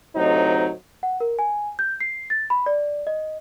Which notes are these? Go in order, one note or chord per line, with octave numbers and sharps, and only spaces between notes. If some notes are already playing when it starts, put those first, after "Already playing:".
D2 A2 C3 F#3 D#4 C5
F#5
A#4
G#5
G6
C7
A6
B5
D5
D#5